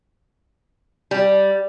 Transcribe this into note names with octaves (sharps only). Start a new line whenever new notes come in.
G3